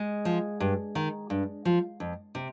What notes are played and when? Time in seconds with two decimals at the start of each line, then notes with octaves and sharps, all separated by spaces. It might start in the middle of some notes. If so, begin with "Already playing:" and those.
Already playing: G#3
0.25 F3
0.60 G2
0.95 D#3
1.30 G2
1.65 F3
2.00 F2
2.35 C3